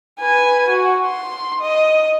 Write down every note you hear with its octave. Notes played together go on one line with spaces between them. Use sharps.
B4 G#5
F#4
C6
D#5